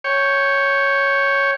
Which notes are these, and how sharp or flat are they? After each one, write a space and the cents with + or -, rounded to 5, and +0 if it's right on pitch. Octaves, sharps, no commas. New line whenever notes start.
C#5 +0 G5 +0